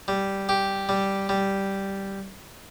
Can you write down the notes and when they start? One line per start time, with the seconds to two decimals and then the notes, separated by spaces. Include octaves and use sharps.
0.08 G3
0.49 G4
0.89 G3
1.29 G3